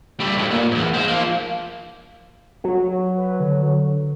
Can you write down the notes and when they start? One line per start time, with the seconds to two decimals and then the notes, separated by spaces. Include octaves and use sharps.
0.20 G3 A3
0.35 B1 A2
0.50 A#2
0.71 E2 G#2
0.94 G#3 C5
1.08 F3 A#3
2.64 F#3
3.17 B4
3.40 D3